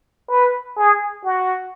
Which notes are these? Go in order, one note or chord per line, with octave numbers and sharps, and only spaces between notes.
B4
G#4
F#4